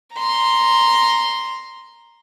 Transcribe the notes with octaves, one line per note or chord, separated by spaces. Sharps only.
A#5 C6